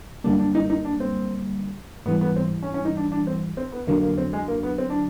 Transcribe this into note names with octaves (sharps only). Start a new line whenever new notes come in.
F#2 D3 G3 A#3 D4
D4
D#4
D#4
D4
C4
G#2 E3 G3 B3
B3
C4
C#4
C#4
D#4
D4
D4
C4
C4
B3
F2 D3 F#3 A#3
A#3
C4
G#3
A#3
B3
C4
D4